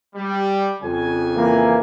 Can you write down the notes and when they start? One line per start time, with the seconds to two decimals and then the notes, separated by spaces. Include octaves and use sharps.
0.16 G3
0.82 F2 C#3 G#5
1.36 E3 A#3